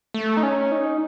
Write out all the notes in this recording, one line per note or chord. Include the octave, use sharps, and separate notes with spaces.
A3
D#4
C#4
D#4